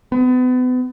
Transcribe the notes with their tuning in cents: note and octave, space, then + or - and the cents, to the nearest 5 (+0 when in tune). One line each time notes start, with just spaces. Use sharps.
B3 +35